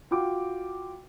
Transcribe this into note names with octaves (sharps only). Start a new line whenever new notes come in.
F4 F#4 G5 D6